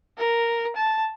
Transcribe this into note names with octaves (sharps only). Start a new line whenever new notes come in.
A#4
A5